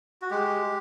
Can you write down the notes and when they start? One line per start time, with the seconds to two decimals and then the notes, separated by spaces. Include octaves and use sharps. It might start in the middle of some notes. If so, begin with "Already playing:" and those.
0.22 F#4
0.30 G#3 G4